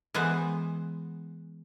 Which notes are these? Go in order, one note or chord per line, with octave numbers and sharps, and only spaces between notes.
E3 G#3 B3 C5